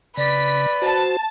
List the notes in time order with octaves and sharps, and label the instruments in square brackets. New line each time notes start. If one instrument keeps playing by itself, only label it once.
[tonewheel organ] C#3 [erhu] B4 [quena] D5 [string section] B6
[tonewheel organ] F#4 C5 [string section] A5